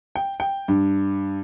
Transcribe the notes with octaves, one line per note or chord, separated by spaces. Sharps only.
G5
G5
G2